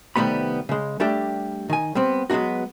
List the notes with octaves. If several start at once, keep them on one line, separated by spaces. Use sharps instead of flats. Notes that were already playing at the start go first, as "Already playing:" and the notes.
C2 D#3 G3 A3 B3 B5
C#3 G#3
G3 A3 D4 G4
D#3 G#5
G3 B3 C4
F#3 G#3 B3 D#4 F#4